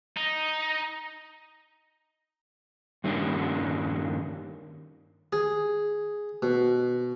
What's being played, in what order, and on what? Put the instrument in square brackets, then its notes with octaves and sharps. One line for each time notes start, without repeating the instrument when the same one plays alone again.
[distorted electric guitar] D#4
[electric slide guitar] G2 D#3 G3 A#3 C#4 D4
[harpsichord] G#4
B2